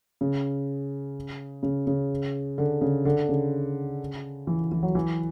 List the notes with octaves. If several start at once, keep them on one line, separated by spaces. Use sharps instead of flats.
C#3
C#3
C#3
D3
C#3
D3
C#3
E3
E3
F#3
E3